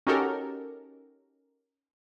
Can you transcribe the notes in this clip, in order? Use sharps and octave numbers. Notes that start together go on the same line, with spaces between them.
C#4 D#4 F#4 G4 A4 A#4